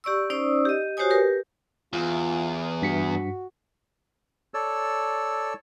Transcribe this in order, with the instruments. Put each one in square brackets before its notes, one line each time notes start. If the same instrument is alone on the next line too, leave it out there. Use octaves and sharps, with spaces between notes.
[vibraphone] G4 D5 C#6 E6
C#4 D#4 C5 D5 D#6 E6
G4 D#5
F#4 G4 C5 C#5 G#5 D#6
G4 A#4 B4
[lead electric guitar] E2 [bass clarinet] F4
[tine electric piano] G2 B6 C#7 [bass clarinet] F#4
[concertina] A4 C#5 D5 E6